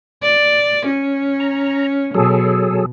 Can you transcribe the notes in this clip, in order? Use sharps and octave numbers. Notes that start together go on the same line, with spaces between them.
D5
C#4
A#5
B2 F#3 G#4 A4